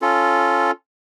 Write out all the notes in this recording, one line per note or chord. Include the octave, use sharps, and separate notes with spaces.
C#4 F4 A4